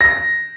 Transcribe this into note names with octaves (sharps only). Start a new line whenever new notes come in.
A#6